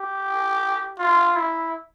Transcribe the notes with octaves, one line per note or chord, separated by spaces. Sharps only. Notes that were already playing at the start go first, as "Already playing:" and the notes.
Already playing: G4
F4
E4